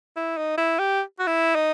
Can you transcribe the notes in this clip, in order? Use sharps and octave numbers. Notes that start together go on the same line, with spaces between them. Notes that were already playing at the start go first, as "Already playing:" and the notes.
E4
D#4
E4
G4
F#4
E4
D#4